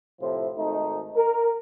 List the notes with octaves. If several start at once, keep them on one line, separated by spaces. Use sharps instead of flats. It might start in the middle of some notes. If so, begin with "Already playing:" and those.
A2 C3 F3 E4
G#1 A3 D#4
A#4